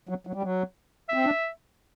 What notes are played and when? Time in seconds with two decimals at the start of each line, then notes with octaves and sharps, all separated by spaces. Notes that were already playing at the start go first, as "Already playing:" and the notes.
0.09 F#3
0.27 F#3
0.34 G3
0.43 F#3
1.09 E5
1.14 C4
1.25 D4